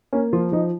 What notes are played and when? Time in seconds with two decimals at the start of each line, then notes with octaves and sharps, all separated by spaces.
0.12 A#3 C#4
0.33 F3 F4
0.52 F3 D#4